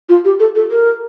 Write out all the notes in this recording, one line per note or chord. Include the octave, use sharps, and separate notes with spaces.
F4
G4
A4
A4
A#4